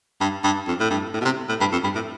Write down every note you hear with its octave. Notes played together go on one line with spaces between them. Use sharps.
G2
G2
F2
A2
G2
A2
B2
C3
A2
G2
F2
G2
A2